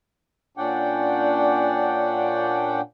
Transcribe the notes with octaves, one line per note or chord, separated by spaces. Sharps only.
A#2 C#4 D4 D5 F#5 G5